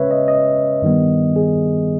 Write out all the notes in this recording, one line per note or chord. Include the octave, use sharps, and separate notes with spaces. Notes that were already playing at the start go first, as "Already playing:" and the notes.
Already playing: C#3 G#3 C#4 B4 C#5 E5
D#5
D#5
G2 D#3 G3 B3
G#4